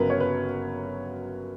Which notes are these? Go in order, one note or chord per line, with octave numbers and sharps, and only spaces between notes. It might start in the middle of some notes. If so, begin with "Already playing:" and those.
Already playing: G1 C#3 F#3 A#4 B4
C#5
B4